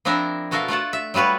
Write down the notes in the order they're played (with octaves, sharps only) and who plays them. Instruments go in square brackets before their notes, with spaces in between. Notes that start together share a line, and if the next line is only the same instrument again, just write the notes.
[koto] F3 C4 D4 E4 A#4 E5
B2 F#4 A4 A#4 E5 F5
A3 F4 F#5 A5
E5
F#3 G3 F4 B4 C#5